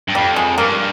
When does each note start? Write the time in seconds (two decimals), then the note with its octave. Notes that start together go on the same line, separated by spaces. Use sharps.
0.08 G2
0.15 F2 G3
0.36 G#3
0.58 G2 A#3